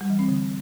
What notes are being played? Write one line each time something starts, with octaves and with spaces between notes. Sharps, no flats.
G3
E3
C4
D3